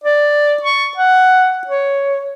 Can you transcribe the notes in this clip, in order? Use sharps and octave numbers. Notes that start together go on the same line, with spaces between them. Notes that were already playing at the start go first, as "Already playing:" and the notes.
D5
C#6
F#5
C#5